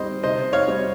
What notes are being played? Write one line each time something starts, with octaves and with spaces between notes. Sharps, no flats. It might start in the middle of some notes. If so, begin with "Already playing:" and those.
Already playing: G3 C4 C5 D#5
C3 C5 D#5
C#5 F5
G3 C4